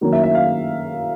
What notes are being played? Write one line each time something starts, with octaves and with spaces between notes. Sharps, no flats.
D#3 F#3 A#3 C#4
E5
E5
F5